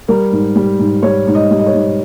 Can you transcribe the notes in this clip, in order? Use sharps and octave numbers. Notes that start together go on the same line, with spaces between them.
G3 A#4
G#2
G3
G#2
G3 C#5
G#2
D#5
G3
D#5
C#5
G#2